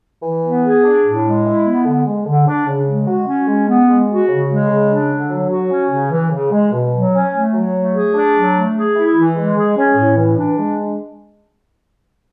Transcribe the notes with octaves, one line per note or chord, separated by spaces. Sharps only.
E3
B3
G#4
D4
A2
G#3
E4
B3
D3
G#3
D3
D4
C#3
G#3
F#4
C#4
G#3
B3
G#3
F#4
C#3
G#3
C#3
D4
D3
F#3
F#4
C#4
C#3
E3
C#3
G#3
B2
F#3
C#4
A3
F#3
A3
G#4
D4
F#3
A3
G#4
E4
E3
G#3
G#4
C#4
A2
E3
D4
G#3